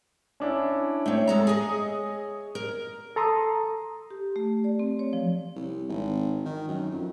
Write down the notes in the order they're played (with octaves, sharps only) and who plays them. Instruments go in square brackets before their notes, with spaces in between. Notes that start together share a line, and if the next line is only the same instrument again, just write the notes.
[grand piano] C#4 D4 E4
[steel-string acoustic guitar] A3 C4 [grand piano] C#5 E5
[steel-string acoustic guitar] G#3 A4 A#5
G#4 D#5
A#4
[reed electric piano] A4 A#5 C6 D#6
[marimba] G4
A3
D5
C4
C#5
F3
[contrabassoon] C2
G#1
D#3
F#2
F2